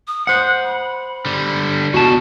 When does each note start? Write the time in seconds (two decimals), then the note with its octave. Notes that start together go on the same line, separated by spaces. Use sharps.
0.08 D#6
0.27 C5 F#5 F#6
0.64 B5
1.26 D3 G3
1.94 E2 B2 F#4 A5